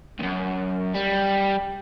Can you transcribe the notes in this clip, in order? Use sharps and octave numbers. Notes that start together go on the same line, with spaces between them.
C#2 F#2
G3